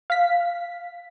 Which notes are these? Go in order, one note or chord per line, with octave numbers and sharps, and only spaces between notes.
F5 B6